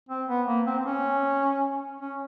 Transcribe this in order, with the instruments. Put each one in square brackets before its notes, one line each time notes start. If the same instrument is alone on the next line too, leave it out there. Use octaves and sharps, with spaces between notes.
[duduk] C4
B3
A#3
C4
C4
C#4
C#4